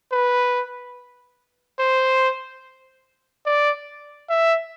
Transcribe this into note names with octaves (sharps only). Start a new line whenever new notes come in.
B4
C5
D5
E5